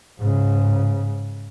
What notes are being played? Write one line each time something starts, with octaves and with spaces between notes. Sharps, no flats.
G#2 C#3